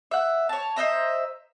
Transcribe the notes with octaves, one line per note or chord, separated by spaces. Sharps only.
E5 F#5
C#5 A5
C5 D#5 E5 A#5